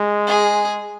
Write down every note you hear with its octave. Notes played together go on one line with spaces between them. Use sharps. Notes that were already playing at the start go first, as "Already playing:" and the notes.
Already playing: G#3
G#4